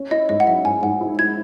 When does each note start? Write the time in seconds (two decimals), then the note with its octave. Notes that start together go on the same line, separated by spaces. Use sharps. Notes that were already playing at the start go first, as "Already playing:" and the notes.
Already playing: C#4
0.11 E4 D#5
0.29 G#2 D#5
0.40 F#5
0.47 F#3 E5
0.64 G#2 G#5
0.82 G#2 F#5
1.01 E4
1.19 E4 G#6